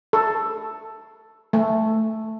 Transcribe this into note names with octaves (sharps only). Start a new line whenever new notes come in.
A4
A3